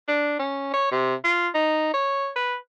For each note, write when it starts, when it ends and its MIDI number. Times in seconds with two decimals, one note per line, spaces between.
0.08 0.36 62
0.39 0.73 61
0.74 0.91 73
0.92 1.14 48
1.24 1.48 65
1.54 1.93 63
1.94 2.30 73
2.36 2.56 71